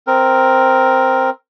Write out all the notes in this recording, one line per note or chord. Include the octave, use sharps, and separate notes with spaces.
C4 A#4